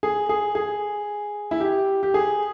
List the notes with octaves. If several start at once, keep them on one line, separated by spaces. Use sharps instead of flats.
G#4
G#4
G#4
E4
G4
G4
G#4